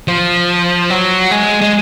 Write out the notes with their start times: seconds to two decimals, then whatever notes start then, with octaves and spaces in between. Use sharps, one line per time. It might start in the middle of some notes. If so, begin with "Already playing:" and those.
0.08 F3
0.90 F#3
1.31 G#3
1.61 G#3